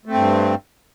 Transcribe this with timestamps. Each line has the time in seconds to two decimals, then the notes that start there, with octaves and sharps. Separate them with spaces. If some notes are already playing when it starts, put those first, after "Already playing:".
0.05 A3
0.10 C4
0.14 G2